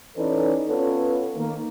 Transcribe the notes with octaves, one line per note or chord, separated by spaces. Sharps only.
E3 C#4 D#4 A4 B4 D5
B3 C#4 F4 A4 B4 C#5
D#3 A#3